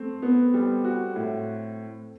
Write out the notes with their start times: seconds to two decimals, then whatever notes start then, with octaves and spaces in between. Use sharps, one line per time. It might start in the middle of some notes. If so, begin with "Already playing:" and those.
Already playing: A3 C4
0.22 B3
0.54 G3
0.85 F#4
1.16 A2